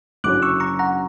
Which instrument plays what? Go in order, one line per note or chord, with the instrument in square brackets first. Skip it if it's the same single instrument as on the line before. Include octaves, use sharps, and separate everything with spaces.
[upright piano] F#1 F#2 D3 F#3 C#4 [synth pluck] D6 F#6
[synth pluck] C#6 E6
A#5 C#6
F#5 A#5